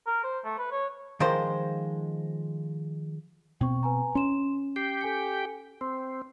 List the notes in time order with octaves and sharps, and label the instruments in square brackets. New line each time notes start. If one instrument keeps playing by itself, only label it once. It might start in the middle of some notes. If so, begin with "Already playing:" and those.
[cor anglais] A#4
C5
A3
B4
C#5
[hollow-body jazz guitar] D#3 F3 G#3 A#4 C5
[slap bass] B2 C4 [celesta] G5 C#6
[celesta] B4 G#5 A#5
[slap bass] C#4 [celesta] C6 E7
[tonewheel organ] G4 G5 [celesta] C7
[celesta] A4 G#5 C#7
[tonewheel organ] C4 [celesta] C6